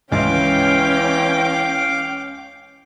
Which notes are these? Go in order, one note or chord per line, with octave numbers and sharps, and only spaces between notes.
C#2 E3 C#4 F5 G5 D6